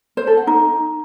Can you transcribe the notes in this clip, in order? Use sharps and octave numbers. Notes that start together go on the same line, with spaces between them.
C5
A4
F#5
D#4